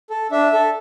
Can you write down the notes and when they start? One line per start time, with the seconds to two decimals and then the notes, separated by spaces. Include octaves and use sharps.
0.10 A4
0.31 D4 E5
0.53 A4